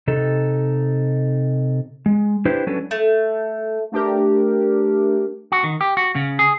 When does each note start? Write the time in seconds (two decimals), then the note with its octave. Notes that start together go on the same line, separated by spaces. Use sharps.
0.08 C3 D#4 A4
2.06 G#3
2.45 D4 E4 G4 B4 C5
2.67 F#3 C#4 D4 A4 B4
2.91 A3
3.92 A3 D4 G4 A#4
5.52 F#4
5.64 D#3
5.81 G4
5.97 F#4
6.15 C#3
6.39 G#4